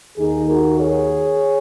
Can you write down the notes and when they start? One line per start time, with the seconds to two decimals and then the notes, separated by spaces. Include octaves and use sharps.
0.18 D#2 D#3 A#3 D#4 G#4
0.49 F#4 A#4
0.79 G#4 C#5